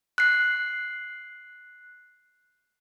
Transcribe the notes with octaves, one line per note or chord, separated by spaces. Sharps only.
F#6 C7